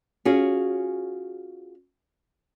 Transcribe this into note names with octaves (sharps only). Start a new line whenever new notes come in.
C#4 F4 F#4 G#4